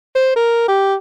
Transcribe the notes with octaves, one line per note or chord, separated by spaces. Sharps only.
C5
A#4
G4